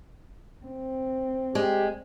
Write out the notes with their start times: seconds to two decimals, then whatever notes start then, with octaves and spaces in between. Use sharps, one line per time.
0.65 C4
1.55 G#3 G4